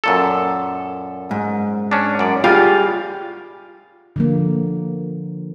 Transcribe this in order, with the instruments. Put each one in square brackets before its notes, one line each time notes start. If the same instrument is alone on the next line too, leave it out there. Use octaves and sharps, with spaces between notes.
[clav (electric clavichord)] F#2 A#2 A4
[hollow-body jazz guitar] G#2
[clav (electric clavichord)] C#4 D4
F#2 D5
[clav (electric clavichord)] G3 F5 [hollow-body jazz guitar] F4 G4 G#4
[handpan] D3 F3 A#3